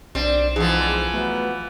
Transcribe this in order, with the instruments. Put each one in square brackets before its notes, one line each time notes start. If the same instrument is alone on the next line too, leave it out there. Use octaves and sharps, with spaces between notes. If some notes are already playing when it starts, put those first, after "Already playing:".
[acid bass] B1 [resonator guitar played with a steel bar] G3 D4 [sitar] C4
[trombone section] G#2 D3 C4 [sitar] E3 F3 [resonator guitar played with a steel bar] G#4
[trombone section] F#3 B3 [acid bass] A3